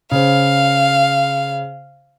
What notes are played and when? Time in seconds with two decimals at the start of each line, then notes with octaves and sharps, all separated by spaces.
0.11 C#3 C5 F5